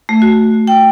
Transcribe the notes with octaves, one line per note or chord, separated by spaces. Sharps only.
A3
F#4
G5